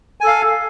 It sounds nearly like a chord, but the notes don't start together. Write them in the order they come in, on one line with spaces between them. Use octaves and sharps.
G#5 A4 F5